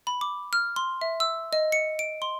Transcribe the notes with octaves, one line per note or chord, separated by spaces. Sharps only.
B5
D6
F6
C6
E5
E6
D#5
C#7
D7
C6